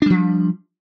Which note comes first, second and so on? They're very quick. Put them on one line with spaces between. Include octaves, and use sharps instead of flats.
D4 G3 F3